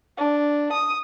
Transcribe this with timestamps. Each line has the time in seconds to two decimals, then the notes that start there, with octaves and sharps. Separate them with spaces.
0.18 D4
0.73 D#6